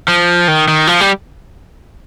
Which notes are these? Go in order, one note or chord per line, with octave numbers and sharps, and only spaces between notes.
F3
D#3
D#3
F3
G3